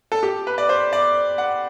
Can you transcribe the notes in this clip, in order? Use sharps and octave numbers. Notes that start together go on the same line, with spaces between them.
A4
G4
B4
D5
C5
D5
F#5